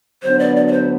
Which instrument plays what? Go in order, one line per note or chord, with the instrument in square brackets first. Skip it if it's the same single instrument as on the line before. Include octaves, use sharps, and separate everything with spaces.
[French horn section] D2 D3 F#3 B3 D4 [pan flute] C5
[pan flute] D5
D5
D5
C5